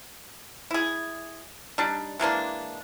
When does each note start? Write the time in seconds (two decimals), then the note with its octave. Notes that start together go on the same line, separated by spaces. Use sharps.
0.71 E4 G#4
1.78 G3 D4 D#4
2.19 E3 G#3 A#3 D4